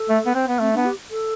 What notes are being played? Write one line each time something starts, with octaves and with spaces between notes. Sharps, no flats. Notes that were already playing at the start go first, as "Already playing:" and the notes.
Already playing: A4
A3
B3
C4
B3
A3 C4
B3 D4
G4
A4